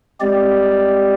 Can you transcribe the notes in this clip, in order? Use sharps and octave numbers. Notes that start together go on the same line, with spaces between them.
G#3 C4 G4 D5